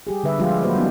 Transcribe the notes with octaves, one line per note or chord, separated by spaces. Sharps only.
G3 G4 G#4
D3 G3 B4 E5
F3 G3 G#3 F4 G4
F#3 A#3 F#4 B4 C5
F#3 G3 B3 C#4 D#4